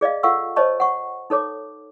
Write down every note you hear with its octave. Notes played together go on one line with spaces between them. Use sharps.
G#4 D5 D#5 F5
F4 A4 F5 F#5 C#6 E6
C5 C#5 D#5 A5 C#6
F#5 C#6
D#4 A4 C#5 D6